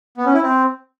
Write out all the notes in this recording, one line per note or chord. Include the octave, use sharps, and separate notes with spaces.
B3
C#4
E4
C4